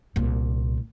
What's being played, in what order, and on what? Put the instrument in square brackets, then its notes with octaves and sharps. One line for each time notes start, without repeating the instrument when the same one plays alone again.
[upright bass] C2 A#2